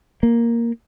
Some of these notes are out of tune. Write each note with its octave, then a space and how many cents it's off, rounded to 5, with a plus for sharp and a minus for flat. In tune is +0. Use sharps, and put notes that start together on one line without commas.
A#3 +0